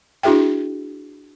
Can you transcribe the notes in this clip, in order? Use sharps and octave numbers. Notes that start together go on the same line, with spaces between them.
D4 E4 F#4 G#4 E5 G5